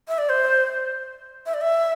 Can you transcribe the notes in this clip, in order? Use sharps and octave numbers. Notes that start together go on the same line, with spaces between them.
E5
D5
C5
E5
D5
E5